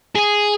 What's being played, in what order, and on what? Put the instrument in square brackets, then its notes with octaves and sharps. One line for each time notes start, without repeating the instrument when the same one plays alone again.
[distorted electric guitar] G#4